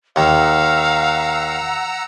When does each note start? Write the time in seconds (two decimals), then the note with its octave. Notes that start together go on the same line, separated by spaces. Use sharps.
0.16 D#2 F5 F#5 A#5 E6